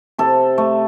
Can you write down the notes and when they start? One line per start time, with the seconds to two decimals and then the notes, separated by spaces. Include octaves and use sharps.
0.18 C3 A4
0.58 A3